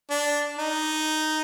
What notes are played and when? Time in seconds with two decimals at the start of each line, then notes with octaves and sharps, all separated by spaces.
0.10 D4
0.59 D#4